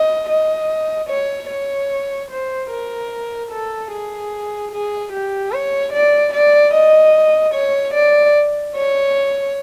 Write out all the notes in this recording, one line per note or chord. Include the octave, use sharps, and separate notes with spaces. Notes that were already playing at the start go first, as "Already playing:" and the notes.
Already playing: D#5
D#5
C#5
C#5
C5
A#4
A4
G#4
G#4
G4
C#5
D5
D5
D#5
C#5
D5
C#5